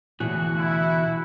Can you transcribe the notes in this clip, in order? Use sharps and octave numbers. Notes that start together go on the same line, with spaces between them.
D2 B2 E3 F#4 G#4
E4